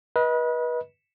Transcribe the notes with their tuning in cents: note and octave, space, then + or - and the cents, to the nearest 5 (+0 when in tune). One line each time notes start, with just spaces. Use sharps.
B4 -30 D#5 +25